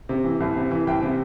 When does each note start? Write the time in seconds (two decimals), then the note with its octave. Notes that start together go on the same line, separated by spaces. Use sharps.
0.09 C3
0.24 E3
0.40 C2
0.56 C3
0.71 E3
0.87 C2 G5
1.02 C3